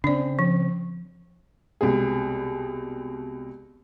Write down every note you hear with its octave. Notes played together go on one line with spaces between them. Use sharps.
C#3 C4 D4 D5
F3
C2 B2 G#3 G#4